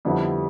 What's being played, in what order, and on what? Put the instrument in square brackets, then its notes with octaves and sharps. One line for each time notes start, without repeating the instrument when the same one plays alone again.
[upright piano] F2 D3 G3 B3 E4